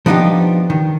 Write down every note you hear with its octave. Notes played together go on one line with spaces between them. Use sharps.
F3 B3 D4 D#4 F4 G4
D#3